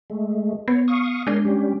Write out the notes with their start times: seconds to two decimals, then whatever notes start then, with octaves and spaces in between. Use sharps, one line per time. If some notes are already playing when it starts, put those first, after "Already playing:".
0.10 G#3 A3
0.68 B3 C#5
0.88 F5 C#6 D#6
1.27 G#3 D4 A#4 C#5 C6
1.45 G3 C#4 G4